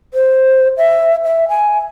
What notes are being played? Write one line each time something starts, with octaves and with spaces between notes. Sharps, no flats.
C5
E5
E5
G#5